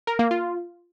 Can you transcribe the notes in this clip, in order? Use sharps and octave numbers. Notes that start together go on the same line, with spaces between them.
A#4
A#3
F4